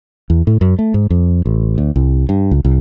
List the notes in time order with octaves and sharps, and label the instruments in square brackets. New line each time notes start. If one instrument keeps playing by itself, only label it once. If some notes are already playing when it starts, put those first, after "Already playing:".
[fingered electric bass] E2
A2
F#2
A3
G#2
F2
A1
D2
C2
G2
C#2
C2